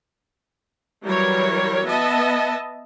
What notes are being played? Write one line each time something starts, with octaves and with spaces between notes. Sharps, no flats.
E3 F#3 G3 A#4 C#5
B3 D#5 E5 A5